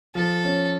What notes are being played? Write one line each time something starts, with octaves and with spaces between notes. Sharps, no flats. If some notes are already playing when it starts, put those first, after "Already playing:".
F3 A4
C#4